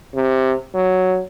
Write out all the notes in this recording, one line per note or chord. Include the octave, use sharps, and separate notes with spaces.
C3
F#3